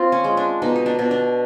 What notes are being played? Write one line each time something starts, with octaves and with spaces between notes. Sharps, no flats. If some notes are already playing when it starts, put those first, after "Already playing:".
Already playing: C4 F4
C#4
G#3
D4
B2 D#4
D#4
D4
B2
D4